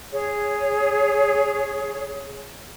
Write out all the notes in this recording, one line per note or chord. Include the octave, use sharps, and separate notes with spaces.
G#4 C#5